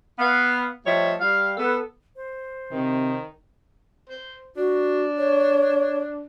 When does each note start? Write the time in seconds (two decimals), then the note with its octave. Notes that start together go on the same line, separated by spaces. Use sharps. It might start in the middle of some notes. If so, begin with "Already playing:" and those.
0.19 B3 F5
0.85 F3 G3 A3 C#5 D#5 E5
1.20 G3 F5
1.57 B3 A4
2.16 C5
2.72 C3 D#3
4.09 C5
4.56 D4 F#4
5.17 C#5